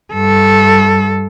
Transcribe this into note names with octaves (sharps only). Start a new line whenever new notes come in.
G2 A4